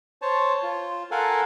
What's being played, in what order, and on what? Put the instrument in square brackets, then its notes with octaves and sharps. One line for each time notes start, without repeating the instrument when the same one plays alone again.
[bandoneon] C5 C#5 A5
F4
A4 A#4 F5 F#5 G#5